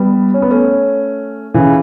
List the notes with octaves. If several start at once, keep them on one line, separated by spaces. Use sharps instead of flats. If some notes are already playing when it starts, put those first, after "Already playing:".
Already playing: G3 B3
C#4
B3
A3 C#4
C#3 E3